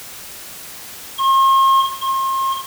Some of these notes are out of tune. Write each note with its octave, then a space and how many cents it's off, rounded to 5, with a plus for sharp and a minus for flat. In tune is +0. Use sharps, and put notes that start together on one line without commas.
C6 +45
C6 +40